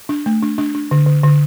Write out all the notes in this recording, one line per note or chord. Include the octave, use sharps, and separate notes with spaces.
D4
A3
D4
D4
D4
D3
D3
D3